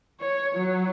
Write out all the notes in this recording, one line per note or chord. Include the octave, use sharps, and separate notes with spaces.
C#5
F#3